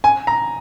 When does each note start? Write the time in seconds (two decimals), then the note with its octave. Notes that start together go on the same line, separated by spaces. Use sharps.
0.04 G#5
0.27 A#5